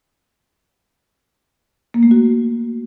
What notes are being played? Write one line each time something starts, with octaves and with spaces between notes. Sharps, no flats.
A#3
A3
F#4